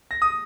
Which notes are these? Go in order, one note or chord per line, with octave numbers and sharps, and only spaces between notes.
A#6
D#6